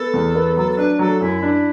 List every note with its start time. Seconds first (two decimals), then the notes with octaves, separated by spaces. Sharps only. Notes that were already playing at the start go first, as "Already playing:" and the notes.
Already playing: B3 A4
0.14 E2
0.35 B3
0.57 F#3 A4
0.72 A4
0.78 D4 B4
0.99 F#3 A4
1.21 F#2 E4
1.42 D4